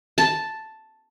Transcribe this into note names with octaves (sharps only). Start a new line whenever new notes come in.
A5